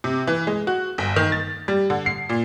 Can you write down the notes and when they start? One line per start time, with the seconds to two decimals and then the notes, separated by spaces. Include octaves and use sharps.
0.04 C3
0.27 E3
0.47 G#3
0.67 F#4
0.98 G1
1.16 D#3
1.32 A6
1.68 G3
1.90 D3
2.06 C7
2.29 A#2